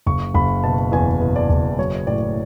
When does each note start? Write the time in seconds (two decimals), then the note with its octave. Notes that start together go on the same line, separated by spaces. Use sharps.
0.06 F#1 C#6
0.34 F#1 B5
0.64 B2 A5
0.92 E2 G#5
1.21 B2
1.36 D5
1.50 F#1
1.78 F#3 C#5
2.07 A2 D5